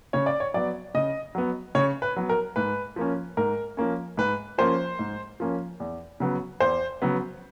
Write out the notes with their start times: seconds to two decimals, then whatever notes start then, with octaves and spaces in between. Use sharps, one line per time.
0.13 C#3 C#5
0.26 D5
0.40 C#5
0.54 F#3 B3 D5
0.94 C#3 D#5
1.35 F#3 B3
1.75 C#3 C#5
2.02 B4
2.16 F#3 B3
2.29 A#4
2.56 G#2 B4
2.96 F3 A#3 C#4
3.37 G#2 A#4
3.77 F3 A#3 C#4
4.17 G#2 B4
4.58 F3 A#3 C#4 C5
4.99 G#2
5.40 F3 A#3 C#4
5.80 E2
6.20 C#3 F#3 B3
6.60 E2 C5
7.02 C#3 F#3 B3